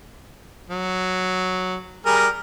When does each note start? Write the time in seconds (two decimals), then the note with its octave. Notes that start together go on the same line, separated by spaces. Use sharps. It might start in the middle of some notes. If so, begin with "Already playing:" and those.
0.70 F#3
2.06 G3 G#4 A#4